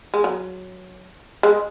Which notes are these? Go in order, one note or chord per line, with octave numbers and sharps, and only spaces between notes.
G#3
F#3
G#3